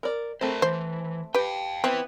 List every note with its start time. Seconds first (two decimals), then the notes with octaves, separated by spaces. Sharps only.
0.03 A#4 D5
0.41 A3 C4 A#4 C5
0.62 E3 C5
1.34 G4 B4 F5 G5
1.84 B3 C4 B4 E5